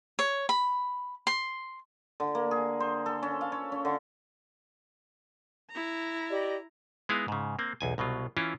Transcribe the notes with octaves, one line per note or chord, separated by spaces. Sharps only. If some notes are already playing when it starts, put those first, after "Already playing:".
C#5
B5
C6
D3
A#3
G#4
C5
A4
C#4
F5
C#5
C#4
D3
E4 A#5
G4 D5 D#5
G#3 B3 D#4 E4 G#4 F5
G#2 C#3
A#3 C4
B1 E2 G#5
C2 B2 F#3 F4
E3 C#4 E4 F4